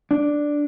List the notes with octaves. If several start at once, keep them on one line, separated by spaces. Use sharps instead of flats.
D4